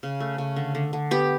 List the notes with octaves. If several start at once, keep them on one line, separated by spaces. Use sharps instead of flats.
C#3
A3
C#3
D3
D3
D3
B3 G4